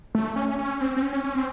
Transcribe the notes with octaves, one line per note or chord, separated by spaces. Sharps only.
A3
C#4
C#4
C4
C4
C#4
C#4
C#4
C4